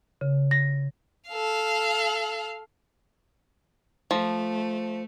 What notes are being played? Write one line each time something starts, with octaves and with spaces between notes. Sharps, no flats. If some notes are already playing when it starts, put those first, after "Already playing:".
C#3
A#6
A4 F5
F3 A3